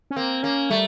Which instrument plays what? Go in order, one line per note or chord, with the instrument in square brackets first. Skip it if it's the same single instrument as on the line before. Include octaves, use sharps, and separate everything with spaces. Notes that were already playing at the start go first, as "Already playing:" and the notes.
[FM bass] C#4
[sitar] A#3 [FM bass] C4
[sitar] A#3 [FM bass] C#4
[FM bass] G3 [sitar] A3